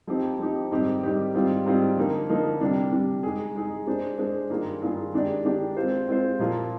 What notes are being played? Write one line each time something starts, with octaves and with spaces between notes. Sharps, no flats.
F3 C4 D#4 G4
F3 C4 D#4 G4
G#2 D#3 G3 C4 G4
G#2 D#3 G3 C4 G4
G#2 G3 C4 F4
G#2 G3 C4 F4
D3 F3 A#3 D#4 A#4
D3 F3 A#3 D#4 A#4
C3 G3 D4
C3 G3 D4
G#3 D#4 G#4
G#3 D#4 G#4
G#3 D4 G#4 C5
G#3 D4 G#4 C5
G2 D#3 A#3 F4 G#4
G2 D#3 A#3 F4 G#4
D#3 G#3 D4 G4 D5
D#3 G#3 D4 G4 D5
G#3 C4 F4 C5
G#3 C4 F4 C5
A#2 F3 A#3 F4